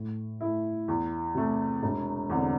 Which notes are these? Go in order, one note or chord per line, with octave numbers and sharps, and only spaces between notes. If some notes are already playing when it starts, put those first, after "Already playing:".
Already playing: A2
A3 E4
E2
C3 A3
E1
E2 D3 C4